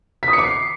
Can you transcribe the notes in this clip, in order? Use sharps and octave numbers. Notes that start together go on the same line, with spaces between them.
B6
D#6
C#7
D6
C7